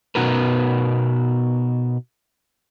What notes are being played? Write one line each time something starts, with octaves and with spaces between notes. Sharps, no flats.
B2 B3 D#4 F#4 A#4 B4